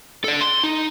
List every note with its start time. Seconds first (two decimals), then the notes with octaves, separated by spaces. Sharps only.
0.24 A4 D5
0.41 C6
0.64 D#4